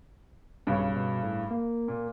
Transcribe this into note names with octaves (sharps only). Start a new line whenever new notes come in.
B1 G2 C#3 C#5
B2
A2
A#3
A#2